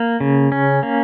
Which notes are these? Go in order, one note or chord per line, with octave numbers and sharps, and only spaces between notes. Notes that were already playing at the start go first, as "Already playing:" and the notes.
Already playing: A#3
C#3
C#4
A#3